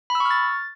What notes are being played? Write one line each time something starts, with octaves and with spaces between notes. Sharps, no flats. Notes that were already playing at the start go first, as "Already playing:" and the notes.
B5
E6
C#6
F6
A6